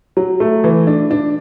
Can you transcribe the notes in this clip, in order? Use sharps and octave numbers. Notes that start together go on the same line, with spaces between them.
F#3
A3
E3
D4
D4